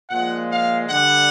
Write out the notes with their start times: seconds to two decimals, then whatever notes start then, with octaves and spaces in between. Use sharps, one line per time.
0.10 A#2 F3 G#3 F#5
0.50 F5
0.87 D3 G3 F#5